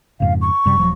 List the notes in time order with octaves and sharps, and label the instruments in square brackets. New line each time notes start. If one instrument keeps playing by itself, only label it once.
[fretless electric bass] F2 G#2 C#3 [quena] F5
[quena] C#6
[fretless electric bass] F#2 C3 G3
D#1 F3 F#3